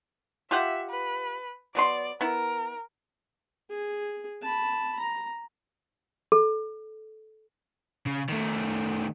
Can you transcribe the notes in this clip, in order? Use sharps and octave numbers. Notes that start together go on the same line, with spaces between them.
F4 G4 E5 F#5
B4
F#3 B3 D5 C6
B3 E4 A#4
G#4
A5 B5
A#5
A4
C#3
D#3 A3